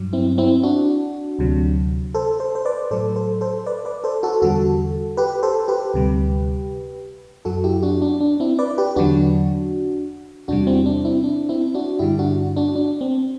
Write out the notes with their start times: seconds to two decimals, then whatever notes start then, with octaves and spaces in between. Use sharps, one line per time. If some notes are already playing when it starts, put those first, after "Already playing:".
Already playing: G2 F#3
0.13 C4 E4
0.38 C4 E4
0.63 D4 F#4
1.39 D2 C3 F#3
2.14 A4 C5
2.40 A4 C5
2.55 C5
2.65 B4 D5
2.91 A2 F#3 A4 C5
3.16 A4 C5
3.41 A4 C5
3.67 B4 D5
3.85 B4 D5
4.04 A4 C5
4.23 F#4 A4
4.42 E2 D3 G3 F#4 A4
5.17 G4 B4
5.43 A4 C5
5.68 G4 B4
5.94 D2 C3 G3
7.45 F#2 F#3 F#4 A4
7.64 E4 G4
7.82 D4 F#4
8.02 D4
8.20 D4
8.40 C4 E4
8.59 B4 D5
8.78 G4 B4
8.96 E2 D3 F#3 D4 F#4
10.48 E2 C3 G3 D4 F#4
10.67 C4 E4
10.86 D4
11.05 C4 E4
11.24 D4
11.49 C4 E4
11.74 D4 F#4
11.99 G2 D3 G3 E4 G4
12.19 D4 F#4
12.56 D4 F#4
12.76 D4
13.01 C4